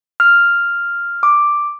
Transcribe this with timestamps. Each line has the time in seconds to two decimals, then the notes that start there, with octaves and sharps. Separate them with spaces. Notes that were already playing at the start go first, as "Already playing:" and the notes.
0.20 F6
1.23 D6